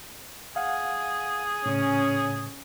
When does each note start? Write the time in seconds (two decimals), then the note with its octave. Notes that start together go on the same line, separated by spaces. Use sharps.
0.56 G#4 F5 F#5
1.66 A2 C#3 C#4 D#6